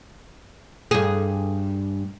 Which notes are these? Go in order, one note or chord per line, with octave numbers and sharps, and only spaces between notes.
G2 G#4